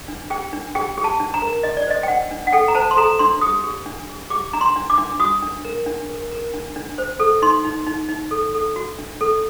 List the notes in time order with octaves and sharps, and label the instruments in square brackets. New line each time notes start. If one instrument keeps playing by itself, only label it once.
[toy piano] D4
G4 G5
D4
G4 G5
G4
A5
D4
A#5
A#4
D4 D#5
D5
C5 D#5
G5
D4 F#5
D4
F#5
A4 G5
A#5
C5 A5
C6
A4 A#5
D4 C6
G4 D#6
G4
D4
G4
G4 D6
D4 A#5
C6
D4
D6
D4
F#4 D#6
D4
A#4
D4
A#4
A#4
D4
D4
C5
A4
D#4 C6
D#4
D#4
D#4
A4
A4
F#4
D4
A4